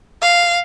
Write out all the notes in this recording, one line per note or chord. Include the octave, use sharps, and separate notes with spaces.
F5